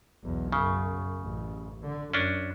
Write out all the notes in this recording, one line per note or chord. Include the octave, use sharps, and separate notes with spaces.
B1 E2
F#2 C#3
A1
D3
F#2 C#4 D4